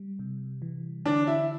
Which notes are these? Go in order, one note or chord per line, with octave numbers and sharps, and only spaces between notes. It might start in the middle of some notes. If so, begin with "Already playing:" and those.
Already playing: G3
C3
E3
D3 D4
E4